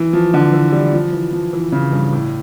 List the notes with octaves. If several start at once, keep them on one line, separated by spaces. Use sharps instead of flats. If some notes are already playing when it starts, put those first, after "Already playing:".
Already playing: E3
F3
D3
E3
G3
F3
E3
F3
E3
C#3
G2
A2